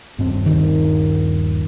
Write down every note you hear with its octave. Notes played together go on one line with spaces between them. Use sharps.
D#1 G2 C4
D#3